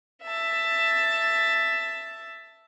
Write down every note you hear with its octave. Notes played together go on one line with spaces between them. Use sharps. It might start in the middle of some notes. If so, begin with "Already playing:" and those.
E5 A5